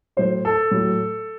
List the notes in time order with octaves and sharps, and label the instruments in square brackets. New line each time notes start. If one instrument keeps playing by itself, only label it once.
[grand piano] A2 F#3 C5
A4
A2 F#3